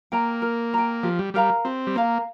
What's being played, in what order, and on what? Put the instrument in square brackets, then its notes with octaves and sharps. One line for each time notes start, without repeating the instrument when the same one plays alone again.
[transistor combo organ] A#3 [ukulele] G5 A#5
[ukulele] A#4
G5 A#5
[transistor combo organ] F3 [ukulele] G4
[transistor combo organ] G3
[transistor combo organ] G3 [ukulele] A#4 F5 A#5
[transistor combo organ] C4 [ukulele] G4
[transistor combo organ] G3
[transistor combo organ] A#3 [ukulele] A#4 F5 A#5